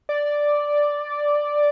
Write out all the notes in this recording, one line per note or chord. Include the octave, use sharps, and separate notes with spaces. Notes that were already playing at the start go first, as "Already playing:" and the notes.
D5